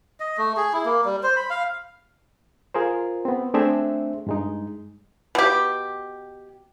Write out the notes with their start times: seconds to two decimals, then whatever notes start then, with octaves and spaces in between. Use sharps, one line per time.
0.20 D#5
0.38 A3
0.57 G#4
0.73 E4
0.85 A#3
1.05 G3
1.23 C5
1.36 B5
1.50 F5
2.74 F4 G#4 A#4 C5
3.25 B3 C4
3.54 A3 C4 D4 G#4 C5 E5
4.27 G2 G#3 D#4
5.35 B2 G4